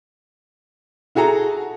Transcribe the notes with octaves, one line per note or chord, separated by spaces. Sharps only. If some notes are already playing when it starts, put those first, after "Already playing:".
E4 F#4 G#4 A4 A#5